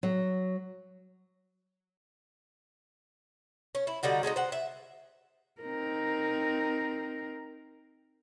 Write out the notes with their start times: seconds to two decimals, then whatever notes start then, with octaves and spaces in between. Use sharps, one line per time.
0.03 F#3
3.75 C#4
3.87 E4
4.03 D3 G3 D#4 F#4
4.23 G#3 A3 C4 D#4
4.36 C5 F#5
4.52 E5
5.62 C4 D#4 A#4